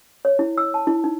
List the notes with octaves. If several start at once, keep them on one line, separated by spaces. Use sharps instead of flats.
C#5
E4
E6
A5
E4
D#4